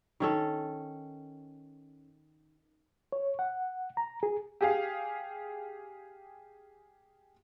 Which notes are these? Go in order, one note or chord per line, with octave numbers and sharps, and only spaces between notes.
D#3 C#4 A4
C#5
F#5
A#5
G#4
G4 G#4 F5